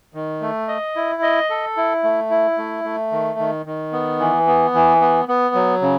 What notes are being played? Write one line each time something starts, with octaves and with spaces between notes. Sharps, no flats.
D#3
A3
D#5
E4
D#5
A4
E4
A3
E4
A3
A3
D#3
D#3
D#3
B3
E3
B3
E3
B3
B3
F#3
C#3